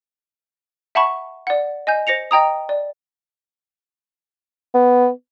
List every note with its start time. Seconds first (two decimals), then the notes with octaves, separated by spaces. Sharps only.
0.95 E5 F#5 A5 B5 C#6
1.47 D5 F#5
1.87 D#5 G#5 G6
2.07 C5 A#6 C#7 F7
2.31 D#5 G5 A#5 D#6
2.69 D5
4.74 B3